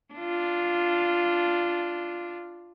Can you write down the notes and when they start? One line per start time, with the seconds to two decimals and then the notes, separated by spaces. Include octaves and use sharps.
0.14 D4 F4